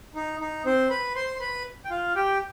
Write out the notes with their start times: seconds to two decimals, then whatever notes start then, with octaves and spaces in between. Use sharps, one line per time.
0.15 D#4
0.40 D#4
0.65 C4 C5
0.90 B4 B5
1.15 C5 C6
1.36 C6
1.40 B4 B5
1.85 G5
1.90 F4 F5
2.15 G4 G5